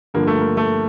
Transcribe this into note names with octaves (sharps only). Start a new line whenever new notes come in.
G2 D3 F3 A#3
A3
A#3
A3